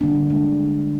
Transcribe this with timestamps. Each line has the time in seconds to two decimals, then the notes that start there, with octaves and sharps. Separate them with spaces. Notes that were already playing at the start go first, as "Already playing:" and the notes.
0.01 D3 G3 A#3 D4
0.30 D3 G#3